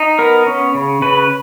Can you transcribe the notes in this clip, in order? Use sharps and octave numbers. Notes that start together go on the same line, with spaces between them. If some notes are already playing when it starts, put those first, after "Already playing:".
Already playing: D#4
B3 A#4
C#4
C#3
C#3 B4